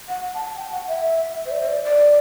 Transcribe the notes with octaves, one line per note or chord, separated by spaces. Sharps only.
F#5
A5
A5
G5
F#5
E5
C5
D5
C5
D5
D5